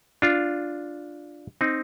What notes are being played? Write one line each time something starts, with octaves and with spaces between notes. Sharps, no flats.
D4 F4
C4 D#4